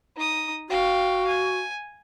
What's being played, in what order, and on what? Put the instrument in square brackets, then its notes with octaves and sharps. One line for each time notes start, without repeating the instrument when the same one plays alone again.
[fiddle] D#4 D#6
[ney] F#4 [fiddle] F5 G5
[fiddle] G#5